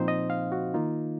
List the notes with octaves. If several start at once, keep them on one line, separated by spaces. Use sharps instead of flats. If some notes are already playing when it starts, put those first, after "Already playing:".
Already playing: A#2 F3 C4 D#4 C5
D#5
F5
F#4
D#3 A#3 D#4 F4